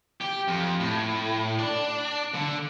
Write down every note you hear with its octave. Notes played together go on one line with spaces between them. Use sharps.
G4
F2
A2
D4
D3